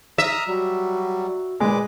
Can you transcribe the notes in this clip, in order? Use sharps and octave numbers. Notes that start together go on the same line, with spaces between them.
E5 A#5 D#6 F6
F#3 G3 F#4
A#2 G#3 B4 D6